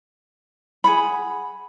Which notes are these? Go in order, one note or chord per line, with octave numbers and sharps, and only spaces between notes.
G#4 F#5 B5